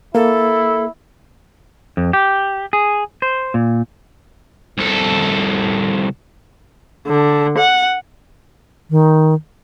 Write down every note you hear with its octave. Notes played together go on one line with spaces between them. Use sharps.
A#3 E4 A4
F2
G4
G#4
C5
A#2
C2 A4
D3
F#5
D#3